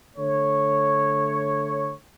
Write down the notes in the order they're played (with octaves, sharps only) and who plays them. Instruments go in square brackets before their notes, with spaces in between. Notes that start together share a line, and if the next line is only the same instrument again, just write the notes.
[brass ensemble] D3 A3 C#5